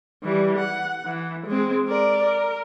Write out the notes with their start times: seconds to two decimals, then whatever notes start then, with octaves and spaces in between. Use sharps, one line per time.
0.23 E3 G3
0.58 F#5
1.05 E3
1.46 G#3 C4
1.87 A#4 D5
2.23 A#4